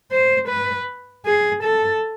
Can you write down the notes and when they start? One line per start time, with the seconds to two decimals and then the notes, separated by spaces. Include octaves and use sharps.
0.11 C5
0.48 B4
1.26 G#4
1.64 A4